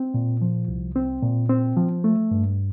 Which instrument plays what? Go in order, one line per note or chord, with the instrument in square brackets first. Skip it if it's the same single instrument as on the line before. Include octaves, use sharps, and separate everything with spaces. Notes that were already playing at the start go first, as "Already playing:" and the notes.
Already playing: [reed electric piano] C4
A#2
F3
C2
C4
A#2
C4
F3
A3
G2